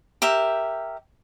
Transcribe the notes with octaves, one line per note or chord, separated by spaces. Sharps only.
G4 A#4 E5